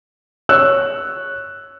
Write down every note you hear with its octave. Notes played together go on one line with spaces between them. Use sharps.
C#5 E6 F#6